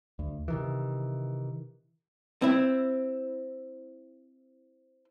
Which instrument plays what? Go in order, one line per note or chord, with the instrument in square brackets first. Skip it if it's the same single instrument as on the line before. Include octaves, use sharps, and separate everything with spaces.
[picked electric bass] D2
C3 D#3 E3
[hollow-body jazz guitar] C4 E4